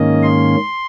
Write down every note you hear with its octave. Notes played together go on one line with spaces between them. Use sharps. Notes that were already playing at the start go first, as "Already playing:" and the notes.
Already playing: G#2 D#3 A#3 C#4 D#5
C6